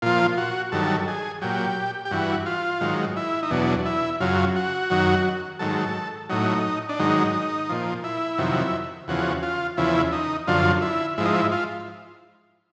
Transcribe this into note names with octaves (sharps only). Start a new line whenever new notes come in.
A#2 F3 F4
F#4
G2 D#3 F#3 A4
G#4
A#2 F#3 G4
G4
G2 E3 F#4
F4
G#2 D#3 F#3
E4
D#4
E2 B2 F#3 D4
E4
F#2 C#3 F#3 F4
F#4
F#2 D#3 F#3
G#2 D#3 F#3 A4
A2 F#3 D#4
D4
G#2 D#3 F#3 D#4
A#2 F3
E4
F2 C3 D#3 F#3
E2 C#3 F3 F#4
F4
E2 C#3 F3 E4
D#4
F#2 D3 F3 F4
E4
G#2 F3 E4
D#4
E4
F4